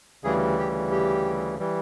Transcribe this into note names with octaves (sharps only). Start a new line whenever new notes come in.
D2 C#3 E3 G3 G#4
G4
G4
E3 G3